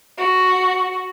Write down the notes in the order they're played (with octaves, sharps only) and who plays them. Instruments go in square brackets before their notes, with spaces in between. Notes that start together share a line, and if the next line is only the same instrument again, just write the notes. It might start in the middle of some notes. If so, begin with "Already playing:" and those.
[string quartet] F#4